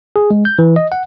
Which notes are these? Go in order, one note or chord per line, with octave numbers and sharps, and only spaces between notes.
G#4
G#3
G6
E3
D#5
F#5